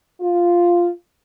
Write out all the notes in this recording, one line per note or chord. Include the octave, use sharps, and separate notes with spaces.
F4